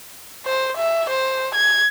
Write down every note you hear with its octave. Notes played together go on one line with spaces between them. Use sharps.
C5
E5
C5
G#6